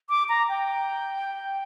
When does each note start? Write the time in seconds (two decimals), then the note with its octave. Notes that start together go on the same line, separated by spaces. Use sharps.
0.10 D6
0.29 A#5
0.49 G5